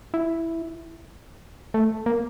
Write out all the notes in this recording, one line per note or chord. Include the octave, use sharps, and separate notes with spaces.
E4
A3
A#3